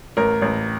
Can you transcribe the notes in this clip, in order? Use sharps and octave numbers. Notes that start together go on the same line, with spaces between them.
A1 A#4
A1